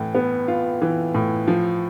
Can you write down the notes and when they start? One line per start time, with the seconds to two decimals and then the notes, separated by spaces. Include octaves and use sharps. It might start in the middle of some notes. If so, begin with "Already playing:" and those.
Already playing: A2 E3
0.15 B3
0.48 F4
0.82 E3
1.14 A2
1.48 F3